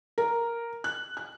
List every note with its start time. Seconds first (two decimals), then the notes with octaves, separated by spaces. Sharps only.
0.18 A#4
0.84 F#6
1.17 F#6